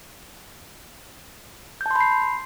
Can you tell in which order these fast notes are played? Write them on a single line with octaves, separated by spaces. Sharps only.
G6 A5 C6 B5 C7